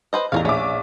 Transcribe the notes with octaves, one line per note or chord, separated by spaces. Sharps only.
B4 C5 D#5
A1 E2 A2 A#4 C#5 F5
A#1 C#4 E5 D6